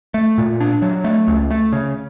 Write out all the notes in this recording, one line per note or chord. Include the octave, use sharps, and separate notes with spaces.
A3
A#2
D4
F#3
A3
C#2
A3
C#3